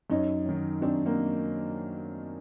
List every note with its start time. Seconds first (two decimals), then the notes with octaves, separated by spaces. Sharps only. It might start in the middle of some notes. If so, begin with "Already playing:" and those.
0.10 F#2 C#4 D#4
0.46 D#3 F#3
0.82 F#2 C4 D4
1.05 A#3 C4